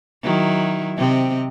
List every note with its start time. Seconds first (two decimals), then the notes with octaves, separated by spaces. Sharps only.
0.23 D#3 F#3 E4
0.97 C3 C4 D#5